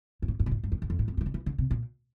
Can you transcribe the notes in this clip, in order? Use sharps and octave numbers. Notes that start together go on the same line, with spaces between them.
G2
A2
G2
A#2
A2
G2
F2
E2
F2
A2
F2
G2
E3
D3
E3
D3
C3
A#2